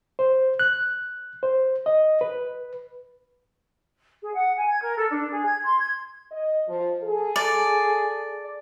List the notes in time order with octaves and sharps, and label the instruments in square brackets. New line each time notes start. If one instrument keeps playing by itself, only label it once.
[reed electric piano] C5
F#6
C5
D#5
B4
[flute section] G#4
F#5
G#5
G#6
A#4
A4
D4
G#4
G#6
C6
G#6
[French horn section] D#5
F3
G#4 A4
[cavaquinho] D5